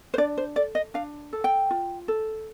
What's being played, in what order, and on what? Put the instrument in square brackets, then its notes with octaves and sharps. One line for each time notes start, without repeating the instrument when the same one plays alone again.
[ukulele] C5
D4 D5
C5
A4 D5
D#5
D4 F5
A4
G5
F4
A4